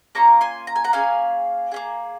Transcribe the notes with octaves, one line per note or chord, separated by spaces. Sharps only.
A#3 C#4 F4 A#5 C#6
G#5 C6
A#5
G#5
F#5 A#5
A#3 C#4 G#4 F5 G#5
A#3 C#4 G#4